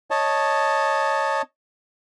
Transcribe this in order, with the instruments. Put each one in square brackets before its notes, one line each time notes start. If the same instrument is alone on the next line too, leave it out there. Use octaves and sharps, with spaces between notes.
[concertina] C#5 D#5 A5